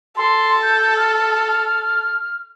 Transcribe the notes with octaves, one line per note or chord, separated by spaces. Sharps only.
A4 C6
G6
F6